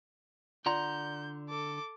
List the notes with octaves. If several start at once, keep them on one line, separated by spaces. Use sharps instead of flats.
D3 F4 D5 F#5 A#5 C6 G6
A4 D6